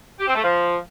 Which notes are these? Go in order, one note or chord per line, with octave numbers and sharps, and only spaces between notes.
G4
C4
A3
F3